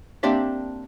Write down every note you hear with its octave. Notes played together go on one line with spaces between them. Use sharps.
A#3 C4 D4 G4 D5 E5